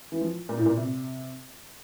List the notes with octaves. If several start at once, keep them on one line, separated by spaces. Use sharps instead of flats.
E3
F3
A#2
A2
A#2
C3